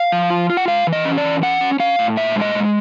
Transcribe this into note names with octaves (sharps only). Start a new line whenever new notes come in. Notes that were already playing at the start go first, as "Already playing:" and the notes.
Already playing: F5
F3
F4
F4
F#5
G#3 F5
E3
D#5
C#4
D5
E3
C#4 F#5
C#4
C#4 F5
A2
A#2 E5
G#3
D#5
G#3